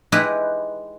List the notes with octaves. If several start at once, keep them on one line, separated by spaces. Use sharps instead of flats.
G#3 D#4 E4 G4 B4